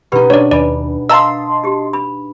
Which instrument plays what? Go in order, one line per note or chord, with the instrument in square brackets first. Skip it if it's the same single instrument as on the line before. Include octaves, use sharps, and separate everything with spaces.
[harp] B2 D#4 [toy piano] G4 B4
[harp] D4 [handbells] C#5 D5
[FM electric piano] D#2 [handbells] D5 [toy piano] G#5 B5
[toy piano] A#4 F5 [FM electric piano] D#5 A5 C6 [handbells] A#5 E6
[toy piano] F#4 G4
B5